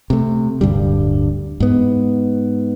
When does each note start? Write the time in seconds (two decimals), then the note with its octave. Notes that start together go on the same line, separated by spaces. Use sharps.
0.10 C3 A3
0.61 D1 G2 D3 G3
1.60 G#2 B3